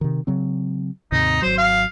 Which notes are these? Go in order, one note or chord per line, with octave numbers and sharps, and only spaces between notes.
C3 D#3
C#3 F#3 C4
D#2 G#2 C3 D#4
G#1 F#3 C5
F5